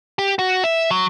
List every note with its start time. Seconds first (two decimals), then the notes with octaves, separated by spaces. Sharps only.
0.19 G4
0.39 F#4
0.64 E5
0.91 F#3